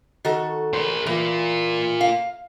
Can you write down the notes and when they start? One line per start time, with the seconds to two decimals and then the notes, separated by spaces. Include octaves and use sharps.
0.25 D#3 F#4 A4
0.73 A#4 C5
1.06 E3 F4 A#4
2.01 F5